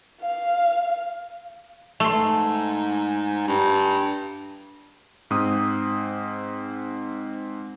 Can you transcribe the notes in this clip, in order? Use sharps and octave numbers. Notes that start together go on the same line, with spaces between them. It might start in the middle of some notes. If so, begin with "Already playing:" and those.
F5
A3 C6
G#2
G2
G#2 C4 D#6